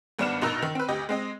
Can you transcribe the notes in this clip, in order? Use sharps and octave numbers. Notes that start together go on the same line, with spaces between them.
G#1 G2 B3 D4 F6 E7
A#1 B2 D#4 A#4 E6
D#3
C4 B4
D2 G4 D#5
G#3 C4 D#5